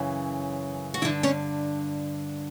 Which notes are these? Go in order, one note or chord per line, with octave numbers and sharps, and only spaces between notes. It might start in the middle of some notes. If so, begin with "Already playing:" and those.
Already playing: F#2 C#3 E3
F#4
G2 D3 E3 E4
C#4 C#5